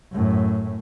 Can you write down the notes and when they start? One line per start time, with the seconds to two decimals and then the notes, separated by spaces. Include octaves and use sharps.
0.12 F#2 A2